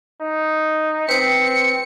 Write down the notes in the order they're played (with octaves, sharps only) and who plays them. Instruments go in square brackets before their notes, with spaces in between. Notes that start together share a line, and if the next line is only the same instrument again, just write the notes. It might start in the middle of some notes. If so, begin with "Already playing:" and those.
[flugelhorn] D#4
[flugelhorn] C4 [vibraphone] B4 C5 [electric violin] C#7